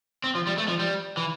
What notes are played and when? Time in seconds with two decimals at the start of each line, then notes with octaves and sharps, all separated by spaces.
0.24 C4
0.35 F3
0.47 G3
0.58 A3
0.68 F3
0.79 G3
1.17 E3